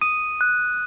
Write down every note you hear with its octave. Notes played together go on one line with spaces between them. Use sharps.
D#6 D#7
F#6